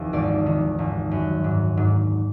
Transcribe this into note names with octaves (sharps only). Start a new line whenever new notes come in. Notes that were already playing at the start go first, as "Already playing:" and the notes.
Already playing: F1 D#2 E3
G#1 D5
D#3
G#1
F#2
G#2
G#2